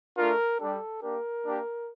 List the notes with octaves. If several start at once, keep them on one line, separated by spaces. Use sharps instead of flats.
A3 D4 F4 A#4
G3 D4 G4 A4
A#3 D4 G4 A#4
A#3 D4 G4